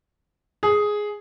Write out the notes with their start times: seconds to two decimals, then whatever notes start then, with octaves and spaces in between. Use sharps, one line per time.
0.63 G#4